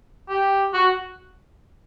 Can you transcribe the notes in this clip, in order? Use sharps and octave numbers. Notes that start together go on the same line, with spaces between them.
G4
F#4